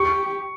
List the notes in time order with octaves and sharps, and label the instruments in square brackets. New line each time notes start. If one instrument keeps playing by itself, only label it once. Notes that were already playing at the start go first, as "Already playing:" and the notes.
Already playing: [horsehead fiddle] G4 [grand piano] C#6